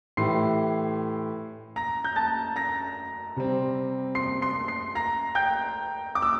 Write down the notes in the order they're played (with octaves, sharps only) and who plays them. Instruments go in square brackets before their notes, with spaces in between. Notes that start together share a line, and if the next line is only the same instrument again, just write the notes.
[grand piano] A2 E3 A3 E4 G4 [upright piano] C6 C7
[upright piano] A#5 A#6
G6
A5 A6
A#5 A#6
[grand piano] C3 G3 C4
[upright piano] C6 C7
C6 C7
C6 C7
A#5 A#6
G5 G6
D6
E6